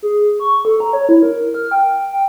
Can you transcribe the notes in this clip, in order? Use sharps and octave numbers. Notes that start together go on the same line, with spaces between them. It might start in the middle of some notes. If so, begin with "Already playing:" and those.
G#4
C#6
A4
A#5
C#5
E4
A#4
F6
G5
G5